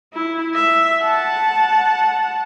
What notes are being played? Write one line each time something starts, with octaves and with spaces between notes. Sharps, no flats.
E4
E5
F#5 A5